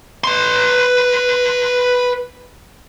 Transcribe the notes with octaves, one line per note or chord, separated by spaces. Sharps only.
B4 C6